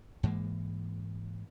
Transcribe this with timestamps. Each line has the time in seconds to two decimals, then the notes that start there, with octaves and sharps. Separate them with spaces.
0.23 G#2 E3 G#3 A#3